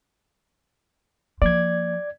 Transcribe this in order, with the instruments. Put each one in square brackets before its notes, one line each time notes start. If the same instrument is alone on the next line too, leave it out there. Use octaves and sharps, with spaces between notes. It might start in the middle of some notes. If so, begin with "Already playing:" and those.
[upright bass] F3 A#3 [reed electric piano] D5 G#6